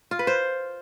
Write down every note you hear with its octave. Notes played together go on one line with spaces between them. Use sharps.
F4
B4
C5